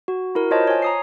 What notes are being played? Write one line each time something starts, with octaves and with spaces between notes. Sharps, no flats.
F#4
E4 F#4 A#4
F4 C5 C#5 D#5 A5
C#5 G#5
A#5 D#6 C7